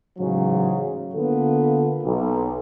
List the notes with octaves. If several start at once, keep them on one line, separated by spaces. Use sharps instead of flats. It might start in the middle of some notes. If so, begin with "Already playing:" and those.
A1 G#2 C#3 F#3
D3 A#3 B3 F4 A4
B1